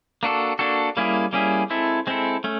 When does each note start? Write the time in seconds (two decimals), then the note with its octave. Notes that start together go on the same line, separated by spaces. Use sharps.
0.23 A#3 D4 F#4 A4
0.59 A#3 D4 F#4 A4
0.97 G3 A#3 C#4 E4 G#4
1.33 G3 A#3 C#4 E4 G#4
1.70 G#3 C4 E4 A4
2.07 G#3 C4 E4 A4
2.44 A3 C#4